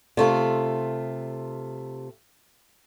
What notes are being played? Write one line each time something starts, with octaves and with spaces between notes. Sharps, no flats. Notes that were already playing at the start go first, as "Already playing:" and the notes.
C3 A3 F4